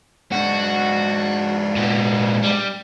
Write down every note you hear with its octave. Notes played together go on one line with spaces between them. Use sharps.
G#2 D4 F#4
A#2 B3
G3